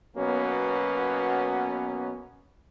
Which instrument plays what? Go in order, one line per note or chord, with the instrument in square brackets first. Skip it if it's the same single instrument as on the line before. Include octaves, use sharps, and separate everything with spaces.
[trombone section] B2 F#3 A#3 B3 C#4